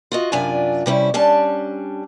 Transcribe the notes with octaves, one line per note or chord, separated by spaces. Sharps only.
F4 F#4 D#5
F#2 C3 D4 F4 G#5
C3 G3 C#4 E4
G3 C#4 D4 A5